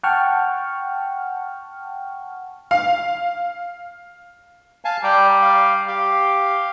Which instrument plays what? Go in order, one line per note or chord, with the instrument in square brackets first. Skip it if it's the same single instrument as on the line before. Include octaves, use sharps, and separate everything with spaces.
[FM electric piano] F#5 G5 A5 C#6 F6
[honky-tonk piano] F5
[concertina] F5 G#5 A5
[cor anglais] G3 [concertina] D5 G5 A#5
[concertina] F5
[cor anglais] G4 [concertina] F5